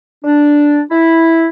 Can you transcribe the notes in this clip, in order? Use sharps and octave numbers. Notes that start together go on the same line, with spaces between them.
D4
E4